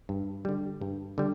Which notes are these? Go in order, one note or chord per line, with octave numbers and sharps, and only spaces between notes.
G2
D3 G3
G2
D3 G3